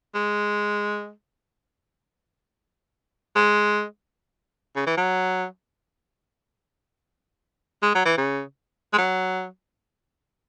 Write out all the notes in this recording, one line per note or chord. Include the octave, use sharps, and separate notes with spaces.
G#3
G#3
C#3
E3
F#3
G#3
F#3
E3
C#3
G#3
F#3